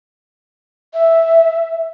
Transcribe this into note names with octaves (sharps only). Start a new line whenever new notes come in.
E5